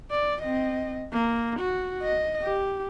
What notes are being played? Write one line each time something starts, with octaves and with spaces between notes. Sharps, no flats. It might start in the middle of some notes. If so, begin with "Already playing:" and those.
D5
C4 D#5
A#3
F#4
D#5
G4